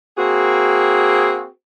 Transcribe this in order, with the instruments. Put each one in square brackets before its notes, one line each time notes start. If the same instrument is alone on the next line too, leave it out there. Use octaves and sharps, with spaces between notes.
[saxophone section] A#3 C4 F#4 G#4